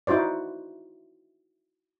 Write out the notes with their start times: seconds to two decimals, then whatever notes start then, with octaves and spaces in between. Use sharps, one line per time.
0.07 D#4 E4 F#4 C5 D5